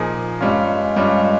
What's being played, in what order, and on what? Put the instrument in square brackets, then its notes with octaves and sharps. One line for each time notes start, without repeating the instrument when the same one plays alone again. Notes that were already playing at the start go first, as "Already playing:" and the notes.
Already playing: [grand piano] A#2 F3 A#3 D#4 G#4
[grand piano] G2 G3 C#4 F4 [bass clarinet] G#3
[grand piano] G2 G3 C#4 F4